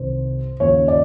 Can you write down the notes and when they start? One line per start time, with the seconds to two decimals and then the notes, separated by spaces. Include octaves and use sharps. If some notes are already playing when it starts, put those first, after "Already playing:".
Already playing: C2 C3 D#3 C5
0.60 D#2 C#3 F3 C#5
0.88 D5